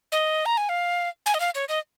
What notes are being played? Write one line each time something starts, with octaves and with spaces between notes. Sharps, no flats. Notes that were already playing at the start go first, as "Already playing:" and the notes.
D#5
A#5
G#5
F5
G#5
D#5
F5
C#5
D#5